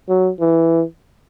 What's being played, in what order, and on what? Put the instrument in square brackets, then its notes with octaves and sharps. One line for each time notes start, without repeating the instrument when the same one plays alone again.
[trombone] F#3
E3